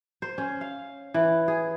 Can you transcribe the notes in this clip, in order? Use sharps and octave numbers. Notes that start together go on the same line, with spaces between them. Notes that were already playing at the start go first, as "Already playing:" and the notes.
C5
C#4
F5
E3
G#4